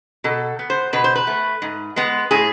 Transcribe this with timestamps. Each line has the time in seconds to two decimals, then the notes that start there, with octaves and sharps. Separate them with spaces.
0.24 B2 A4
0.59 B3
0.70 C5
0.93 B2 B4
1.04 C5
1.15 B4
1.27 A3
1.62 G#2
1.96 G#3 B3
2.31 A2 G#4